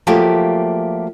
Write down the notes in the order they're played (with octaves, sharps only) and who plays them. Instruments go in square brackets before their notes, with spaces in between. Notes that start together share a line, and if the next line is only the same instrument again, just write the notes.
[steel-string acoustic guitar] F3 F#3 A3 A#3 G4